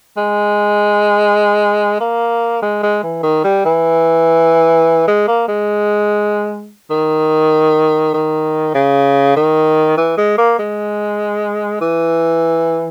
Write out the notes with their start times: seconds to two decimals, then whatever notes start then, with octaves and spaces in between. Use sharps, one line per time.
0.17 G#3
2.00 A#3
2.62 G#3
2.83 G#3
3.03 E3
3.23 D#3
3.44 G3
3.65 E3
5.08 G#3
5.28 A#3
5.48 G#3
6.90 D#3
8.14 D#3
8.74 C#3
9.36 D#3
9.97 E3
10.17 G#3
10.38 A#3
10.59 G#3
11.81 E3